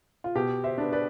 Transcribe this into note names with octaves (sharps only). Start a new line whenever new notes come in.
F4
B2 G4
C5 E5
B3 D4
B4 D5